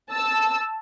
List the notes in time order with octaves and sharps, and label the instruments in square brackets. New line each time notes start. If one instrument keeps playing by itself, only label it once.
[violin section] A5 E6